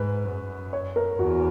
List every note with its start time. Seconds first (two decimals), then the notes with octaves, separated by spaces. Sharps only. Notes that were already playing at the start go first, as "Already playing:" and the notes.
Already playing: G#2 B4
0.25 F#2
0.73 C#5
0.96 A#4
1.19 E2 F#4